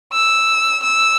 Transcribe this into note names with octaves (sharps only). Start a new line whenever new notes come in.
E6
E6